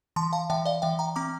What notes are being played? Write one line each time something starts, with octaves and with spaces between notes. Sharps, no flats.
E3 A5 C6
F5 A5
E3 E5 G5
D5 F5
E3 E5 G5
G5 A#5
C4 A#5 D6